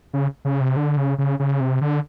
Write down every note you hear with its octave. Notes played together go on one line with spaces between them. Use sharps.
C#3
C#3
C3
D3
C#3
C#3
C#3
C3
D3